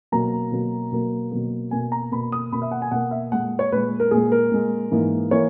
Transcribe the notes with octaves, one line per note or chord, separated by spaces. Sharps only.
B2 F#3 A#3 A#5
B2 F#3 A#3
B2 F#3 A#3
B2 F#3 A#3
B2 A#3 G#5
A#5
B2 A#3 B5
D#6
B2 A#3 B5
E5
F#5
G#5
B2 A#3 F#5
E5
A#2 G#3 F#5
C#5
A#2 G#3 B4
A#4
A#2 G#3 G#4
A#4
A#2 G#3
G#2 E3 A#3
E3 A#3 C#5